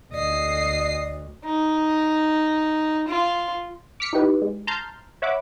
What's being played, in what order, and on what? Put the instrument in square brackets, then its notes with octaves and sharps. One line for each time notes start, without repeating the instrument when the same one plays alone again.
[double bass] D2 [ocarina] D5 [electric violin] D#5 C7
[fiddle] D#4
F4
[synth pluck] D6 F6 B6 C#7
D#4 E4 G4 B4
G#3
A5 A#5 C6 F6 G6 A6
C#5 E5 F#5 B5 D6